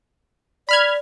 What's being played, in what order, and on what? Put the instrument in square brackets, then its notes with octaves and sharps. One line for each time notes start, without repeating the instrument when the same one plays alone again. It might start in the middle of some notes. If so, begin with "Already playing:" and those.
[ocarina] D5 [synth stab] B5 F6 G#6